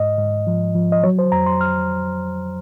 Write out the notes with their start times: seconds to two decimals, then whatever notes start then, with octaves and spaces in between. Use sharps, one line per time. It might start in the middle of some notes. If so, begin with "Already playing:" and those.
Already playing: G#2 D#5
0.18 G#2
0.47 F3
0.75 F3
0.92 D#5
1.04 F#3 C#5
1.19 C5
1.32 F2 A#5
1.46 C6
1.61 F6